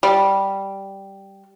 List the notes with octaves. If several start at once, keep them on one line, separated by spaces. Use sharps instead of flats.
G3